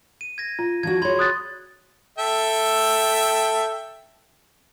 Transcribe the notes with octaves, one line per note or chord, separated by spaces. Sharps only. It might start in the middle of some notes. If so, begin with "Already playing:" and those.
D#7
G#6 A#6 D#7
F4
F3 D4 F#4 G#6
F#4 G#4 C#5 B5 C6 G#6
D#6 F#6 A6
A4 E5 G5